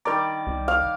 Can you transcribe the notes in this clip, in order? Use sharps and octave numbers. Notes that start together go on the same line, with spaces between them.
D#3 G3 A#4 D5 A#5
C2
F5